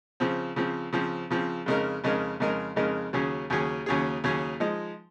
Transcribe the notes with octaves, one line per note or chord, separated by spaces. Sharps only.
C#3 F3 C4
C#3 F3 C4
C#3 F3 C4
C#3 F3 C4
F2 C#3 G#3 D#4 A#4
F2 C#3 G#3 D#4 A#4
F2 C#3 G#3 D#4 A#4
F2 C#3 G#3 D#4 A#4
D#2 C#3 F#3 C#4 G#4
D#2 C#3 F#3 C#4 G#4
D#2 C#3 F#3 C#4 G#4
D#2 C#3 F#3 C#4 G#4
F3 G#3 D#4